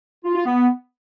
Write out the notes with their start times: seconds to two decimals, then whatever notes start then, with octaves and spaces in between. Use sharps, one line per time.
0.24 F4
0.35 F4
0.46 B3